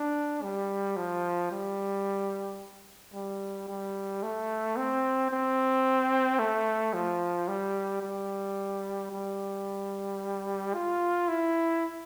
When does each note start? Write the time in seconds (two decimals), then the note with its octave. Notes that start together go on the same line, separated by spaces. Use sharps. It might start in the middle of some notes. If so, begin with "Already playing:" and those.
Already playing: D4
0.43 G3
0.97 F3
1.51 G3
3.14 G3
3.68 G3
4.23 A3
4.77 C4
5.31 C4
6.39 A3
6.94 F3
7.48 G3
8.02 G3
9.11 G3
10.74 F4
11.28 E4